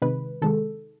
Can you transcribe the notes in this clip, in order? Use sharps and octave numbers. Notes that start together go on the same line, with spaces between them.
C3 D#3 G#3 B4
C3 D#3 G#3 A4